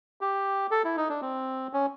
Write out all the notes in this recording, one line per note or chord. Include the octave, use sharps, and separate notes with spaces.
G4
A4
E4
D#4
D4
C4
C#4